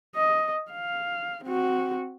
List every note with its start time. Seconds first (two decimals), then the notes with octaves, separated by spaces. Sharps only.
0.16 D#5
0.72 F5
1.44 C4 F#4